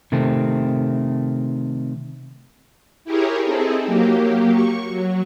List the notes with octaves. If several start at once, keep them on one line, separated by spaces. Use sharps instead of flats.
C3 D#3 A3 C4
E4 G4 G#4 A#4 C#5
C4 D#4 E4 G#4 A4
F#3 A#3 G4
C#6
F#3